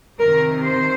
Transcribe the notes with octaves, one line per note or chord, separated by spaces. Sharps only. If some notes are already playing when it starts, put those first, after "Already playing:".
C3 D#3 A#4
C5